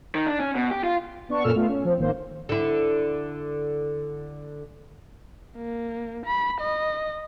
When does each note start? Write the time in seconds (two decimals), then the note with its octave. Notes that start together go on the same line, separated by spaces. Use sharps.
0.15 D#3
0.27 D4
0.40 C#4
0.55 B2
0.71 G4
0.84 F4
1.29 B3 D4 C#6
1.43 F#2 A#2 C#4 A4 E6 F6
1.56 A3 B3 F4 F5
1.68 C#4
1.84 F3 C4
1.98 G#1 D#3 A#3 C5
2.49 D3 E4
5.57 A#3
6.26 B5
6.61 D#5